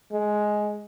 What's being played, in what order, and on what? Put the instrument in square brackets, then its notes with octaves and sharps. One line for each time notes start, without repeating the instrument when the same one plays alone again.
[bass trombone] G#3